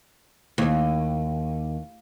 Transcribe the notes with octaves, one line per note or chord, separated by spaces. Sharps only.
D#2